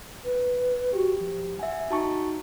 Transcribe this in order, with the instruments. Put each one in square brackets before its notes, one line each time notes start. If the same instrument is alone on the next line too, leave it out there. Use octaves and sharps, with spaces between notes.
[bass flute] B4
[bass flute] F#4 [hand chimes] G4
[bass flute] F3
[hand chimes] E5 G#5 [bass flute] F#5
[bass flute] D#4 [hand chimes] F#4 A5 C#6